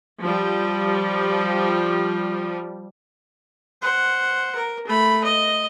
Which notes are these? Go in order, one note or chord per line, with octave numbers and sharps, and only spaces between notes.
F3 G3
C5 F#5
A#4
A3 B5
D#5